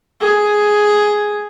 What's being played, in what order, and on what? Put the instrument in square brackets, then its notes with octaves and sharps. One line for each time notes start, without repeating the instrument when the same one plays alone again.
[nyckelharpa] G#4